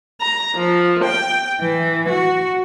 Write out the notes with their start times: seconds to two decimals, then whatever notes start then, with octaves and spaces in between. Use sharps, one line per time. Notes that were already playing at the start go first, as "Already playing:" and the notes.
0.21 A#5
0.55 F3
1.03 G5
1.60 E3
2.09 F#4